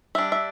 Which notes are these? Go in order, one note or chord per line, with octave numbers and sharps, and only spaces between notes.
G3 D4 E5
E5